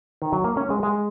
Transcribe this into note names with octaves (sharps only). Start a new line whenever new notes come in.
D#3
F#3
A#3
C#4
G#3
G#3